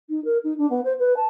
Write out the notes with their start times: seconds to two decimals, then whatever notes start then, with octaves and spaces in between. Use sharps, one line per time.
0.09 D#4
0.25 A#4
0.44 D#4
0.58 D4
0.70 B3
0.84 C5
0.99 B4
1.17 A5